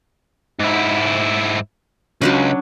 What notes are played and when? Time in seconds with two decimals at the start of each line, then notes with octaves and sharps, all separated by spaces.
0.60 G#2 E4
2.22 C#2 F#3 C#4 D4